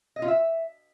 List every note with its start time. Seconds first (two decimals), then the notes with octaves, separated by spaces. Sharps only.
0.16 D#5
0.22 F4
0.28 E5